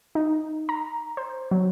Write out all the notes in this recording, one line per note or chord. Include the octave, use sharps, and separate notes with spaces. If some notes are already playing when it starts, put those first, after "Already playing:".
D#4
A#5
C5
F#3